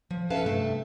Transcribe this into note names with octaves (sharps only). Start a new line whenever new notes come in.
F3
C#4 A4 B4 E5 F5 A5
G2 C3 A3